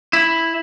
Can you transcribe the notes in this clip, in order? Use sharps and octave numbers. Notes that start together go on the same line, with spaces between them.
E4